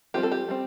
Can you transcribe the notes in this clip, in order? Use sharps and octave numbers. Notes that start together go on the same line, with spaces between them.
G3 C4 F4 G4
A4
G4
G3 C4